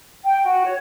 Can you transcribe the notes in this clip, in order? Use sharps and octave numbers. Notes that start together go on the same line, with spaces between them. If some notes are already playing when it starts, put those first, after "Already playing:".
G5
F#4
C#5